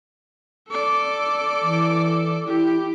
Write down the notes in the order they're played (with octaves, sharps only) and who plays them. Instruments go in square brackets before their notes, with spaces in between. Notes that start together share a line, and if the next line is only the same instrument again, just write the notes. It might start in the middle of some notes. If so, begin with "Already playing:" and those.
[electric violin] A4 D5
[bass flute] E3
[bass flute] E4 [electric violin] G4